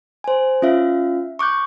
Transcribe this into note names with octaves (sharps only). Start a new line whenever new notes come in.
C5 G#5
C#4 F4 E5 F5
C#6 D6 F#6 G6